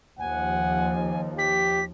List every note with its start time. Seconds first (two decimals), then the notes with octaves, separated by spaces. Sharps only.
0.19 D#2 F3 F#5 G#5
1.38 G4 B6